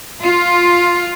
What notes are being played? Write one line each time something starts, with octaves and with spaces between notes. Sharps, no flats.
F4